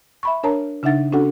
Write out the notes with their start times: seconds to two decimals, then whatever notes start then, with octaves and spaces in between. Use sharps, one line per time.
0.23 E5 B5 C#6
0.43 D4 A#4 C#5 A5 A#5
0.83 C#3 D4 D#4 E5 F#5 A6
1.12 C#4 D4 F#4 A4 F#5